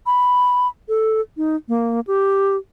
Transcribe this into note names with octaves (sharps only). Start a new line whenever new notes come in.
B5
A4
D#4
A#3
G4